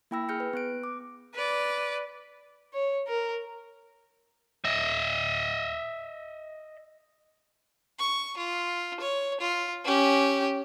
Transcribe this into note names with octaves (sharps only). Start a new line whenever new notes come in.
A#3 E4 G5 B5 E6 A#6
G#4 F6 G6 A#6 C#7
B4
B3 F#6 D7
D6
B4 D5
C#5
A#4
D#5 E5
C#6
F4
C#5
F4
C#4 G4